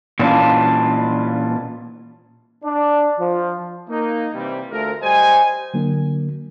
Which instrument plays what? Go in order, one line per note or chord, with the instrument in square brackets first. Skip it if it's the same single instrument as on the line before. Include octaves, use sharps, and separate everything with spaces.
[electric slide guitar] A#2 E3 G3 C#4 D4 F4
[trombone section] D4
F3
[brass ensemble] A#3 D#4
C3 E3 G3
D2 A3 F4 A#4
G3 C5 D#5 G#5
[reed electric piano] D3 F#3 A#3 D4